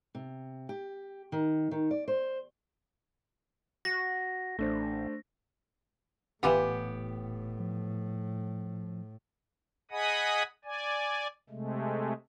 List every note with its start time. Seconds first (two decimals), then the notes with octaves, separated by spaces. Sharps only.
0.15 C3
0.69 G4
1.32 D#3
1.71 D#3
1.91 D5
2.08 C5
3.85 F#4 A#6
4.59 A1 A3 D4 C5
6.43 D#1 A2 E3 B3 F4 G4
7.59 F3
9.91 G#4 D#5 F#5 G#5 B5 D#6
10.64 D5 G#5
11.50 C3 G#3 A3